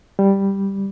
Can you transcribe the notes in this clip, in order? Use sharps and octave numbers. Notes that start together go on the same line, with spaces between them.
G3